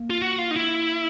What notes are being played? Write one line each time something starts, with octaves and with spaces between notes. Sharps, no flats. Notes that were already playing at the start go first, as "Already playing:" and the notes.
Already playing: A#3
F4
F#4
F4
D#4
E4